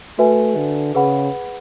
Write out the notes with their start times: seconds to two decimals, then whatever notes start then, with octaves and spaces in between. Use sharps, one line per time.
0.19 A3 F#4 B4 E5 G#5
0.56 D3
0.95 C#3 G#4 B4 F#5 B5